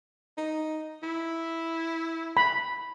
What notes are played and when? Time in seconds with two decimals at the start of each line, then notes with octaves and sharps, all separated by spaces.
0.38 D#4
1.03 E4
2.37 B5